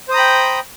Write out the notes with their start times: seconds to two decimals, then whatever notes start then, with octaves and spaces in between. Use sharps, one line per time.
0.09 C5
0.11 D#6
0.14 A#5
0.16 B5
0.19 G5